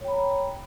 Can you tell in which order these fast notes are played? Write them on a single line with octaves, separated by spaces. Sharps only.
C#5 G5 B5 A#5